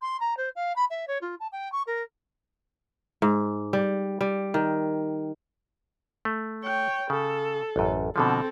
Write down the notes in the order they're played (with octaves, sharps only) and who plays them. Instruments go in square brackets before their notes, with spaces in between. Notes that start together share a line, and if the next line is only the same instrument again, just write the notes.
[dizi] C6
A#5
C5
F5
B5
E5
C#5
F4
A5
G5
C#6
A#4
[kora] G#2
G3
G3
D#3
[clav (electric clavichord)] A3
[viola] C#5 G5
[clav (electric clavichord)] C#3 [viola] A4
[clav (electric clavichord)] A1 F#2
[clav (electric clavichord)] B2 D3 F3 [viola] C4 A4